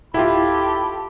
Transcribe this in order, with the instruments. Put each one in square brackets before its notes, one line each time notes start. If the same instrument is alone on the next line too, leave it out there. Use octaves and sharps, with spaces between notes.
[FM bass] D1 [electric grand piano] E4 F4 [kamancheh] G4 A4 [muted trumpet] B5